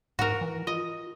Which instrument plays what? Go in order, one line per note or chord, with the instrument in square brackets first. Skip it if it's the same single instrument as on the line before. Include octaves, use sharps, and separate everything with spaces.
[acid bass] G#2 [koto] F#4 A#4
[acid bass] E3
[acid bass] F4 [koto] D#5